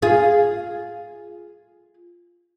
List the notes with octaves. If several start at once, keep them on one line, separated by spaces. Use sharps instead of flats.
F4 G#4